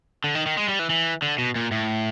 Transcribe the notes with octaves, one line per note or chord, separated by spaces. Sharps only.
D3
D#3
D#3
G#3
G3
E3
E3
D3
B2
A#2
A2